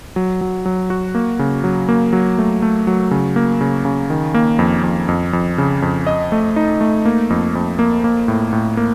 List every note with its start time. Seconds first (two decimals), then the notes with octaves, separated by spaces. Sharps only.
0.16 F#3
0.41 F#3
0.66 F#3
0.90 F#4
1.15 A#3
1.39 C#3
1.64 F#3
1.89 A#3
2.13 F#3
2.38 A3
2.62 A3
2.87 F#3
3.11 C#3
3.36 A#3
3.61 C#3
3.85 C#3
4.10 D#3
4.34 A#3
4.59 F2
4.83 F2
5.08 F2
5.33 F2
5.58 C#3
5.82 F2
6.07 D#5
6.32 A3
6.56 D#4
6.81 A3
7.05 A#3
7.30 F2
7.55 F2
7.79 A#3
8.04 A#3
8.28 A2
8.53 A2
8.77 A#3